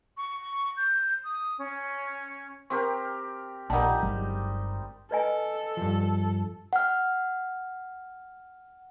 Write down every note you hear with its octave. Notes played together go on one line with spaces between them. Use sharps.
C#6
G6
D#6
C#4
C4 G4 A#4 C#6
A#1 G3 D#4 A#4 F#5 A5
G1 F#3 G#3
A4 B4 D#5 G#5
G2 F3
F#5 F6